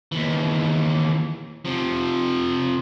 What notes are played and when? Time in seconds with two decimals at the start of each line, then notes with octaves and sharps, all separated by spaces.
0.12 D#2 E3
1.65 C3 F3